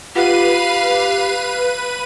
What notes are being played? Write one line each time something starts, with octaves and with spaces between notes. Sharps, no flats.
F4 G4 B4 F5 F#5 D#7